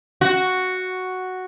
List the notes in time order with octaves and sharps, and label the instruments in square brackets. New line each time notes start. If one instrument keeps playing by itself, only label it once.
[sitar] F#4